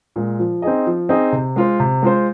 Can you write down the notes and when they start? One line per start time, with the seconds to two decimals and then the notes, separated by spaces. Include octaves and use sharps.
0.16 A#2 G#3
0.39 F3
0.62 C4 D#4 G#4 D#5
0.87 F3
1.09 C4 D#4 G#4 D#5
1.32 C3
1.56 G#3 F4 C5
1.80 C3
2.02 G#3 F4 C5